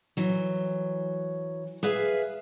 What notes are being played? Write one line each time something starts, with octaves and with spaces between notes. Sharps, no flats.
E3 F#3
G#4 B4 E5 F5